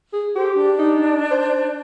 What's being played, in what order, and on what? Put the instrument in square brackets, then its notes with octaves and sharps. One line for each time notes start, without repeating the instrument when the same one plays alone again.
[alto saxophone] G#4
[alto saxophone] G4 [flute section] A4 C5
[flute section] D4
[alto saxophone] D#4
C5